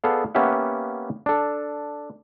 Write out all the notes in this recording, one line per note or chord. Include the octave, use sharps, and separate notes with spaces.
B3 G#4 A4 D5 F5
A#3 B3 C#4 G4 E5 F#5
D4 A4